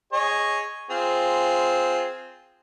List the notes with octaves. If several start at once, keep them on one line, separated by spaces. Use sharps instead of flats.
G#4 C#5 D#5
C4 F4 G#4